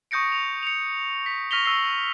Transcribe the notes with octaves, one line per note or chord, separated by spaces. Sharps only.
C#6 D#6 G6 A#6 C#7 D7
F7
C#7 F7
B6
C#6 F6 A#6 B6 F7 G7
C#6 E6 A#6 C7 G7